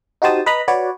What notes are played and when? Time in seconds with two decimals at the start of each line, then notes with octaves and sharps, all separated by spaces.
0.22 D#4 F#4 G4 C5 A5 D#6
0.46 B4 D#5 A#5 B5
0.68 F#4 B4 C#5 D5